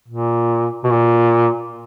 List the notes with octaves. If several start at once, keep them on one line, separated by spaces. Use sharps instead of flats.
A#2
B2
A#2